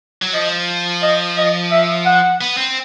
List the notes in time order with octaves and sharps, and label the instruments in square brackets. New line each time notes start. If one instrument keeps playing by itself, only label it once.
[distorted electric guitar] F#3
[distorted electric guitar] F3 [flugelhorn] D#5
[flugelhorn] D#5
D#5
E5
F#5
[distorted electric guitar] B3
C4